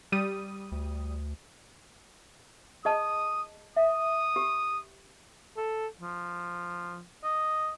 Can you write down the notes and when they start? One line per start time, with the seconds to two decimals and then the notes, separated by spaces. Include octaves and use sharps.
0.12 G3 D#6 D#7
0.72 D2
2.85 G#4 D#5 A5 D#6
3.76 E5 D#6
4.36 G4
5.57 A4
6.01 F3
7.24 D#5